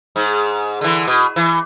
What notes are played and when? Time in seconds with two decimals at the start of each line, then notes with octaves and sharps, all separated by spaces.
0.16 G#2
0.81 D3 E3
1.08 B2
1.36 E3